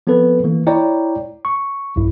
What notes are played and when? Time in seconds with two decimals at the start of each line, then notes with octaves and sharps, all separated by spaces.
0.07 F3 B3 C4 A4 B4
0.44 E3 A#3
0.67 E4 C#5 D5 G5 A#5
1.45 C#6
1.96 B1 G2 E4